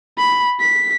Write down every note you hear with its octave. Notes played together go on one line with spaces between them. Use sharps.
B5
B6